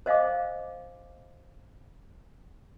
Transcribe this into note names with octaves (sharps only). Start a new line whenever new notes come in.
C5 D#5 F5 G#5 D6